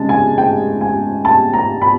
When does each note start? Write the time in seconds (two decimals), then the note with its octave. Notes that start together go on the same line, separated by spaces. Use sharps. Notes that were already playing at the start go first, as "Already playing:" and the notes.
Already playing: C#3 G#3 A5
0.09 G#5
0.38 G5
0.81 G#5
1.25 A5
1.53 A#5
1.82 B5